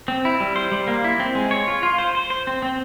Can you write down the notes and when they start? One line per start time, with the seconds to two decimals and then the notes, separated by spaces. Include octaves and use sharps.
0.08 C4
0.25 E4
0.40 G3
0.56 C5
0.72 G3
0.87 A#3
1.04 E4
1.20 C4
1.35 G#3
1.51 C#5
1.67 F4
1.83 F4
1.98 C5
2.15 C5
2.30 C5
2.47 C4
2.62 C4